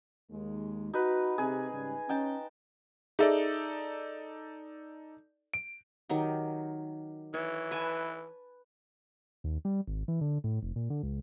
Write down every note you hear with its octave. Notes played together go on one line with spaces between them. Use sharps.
D#2 G#3
D#4 F#4 B4
C3 G#4
G#2 C#3 G3
C#4 D#4 G5 A5
D#4 G#4 A4 D5 E5
D7
D#3 F#3 G4
E3 C#5
B4 G#5 A5
D#2
G3
G#1
E3
D3
A2
F1
A#2
D3
C#2